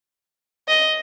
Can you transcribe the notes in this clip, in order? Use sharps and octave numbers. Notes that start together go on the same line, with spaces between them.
D#5